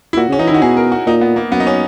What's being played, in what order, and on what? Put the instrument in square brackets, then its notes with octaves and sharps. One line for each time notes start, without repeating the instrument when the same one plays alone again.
[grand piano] E4
[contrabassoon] A#2 [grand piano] F#4
[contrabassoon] C#3
[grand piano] C#4
[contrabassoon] E3 [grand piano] D#4
[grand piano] E4
[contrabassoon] D#3
[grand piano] F#4
[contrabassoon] B2 [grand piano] G#4
[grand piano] A#4
F#4
[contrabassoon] A#2 [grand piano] D#4
[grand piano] B3
A#3
[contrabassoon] F#2 [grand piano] B3
[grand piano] D#4
C#4